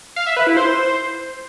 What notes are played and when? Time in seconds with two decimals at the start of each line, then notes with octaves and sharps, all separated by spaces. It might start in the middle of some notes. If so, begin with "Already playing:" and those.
0.16 F5
0.26 E5
0.37 B4
0.47 E4
0.57 C5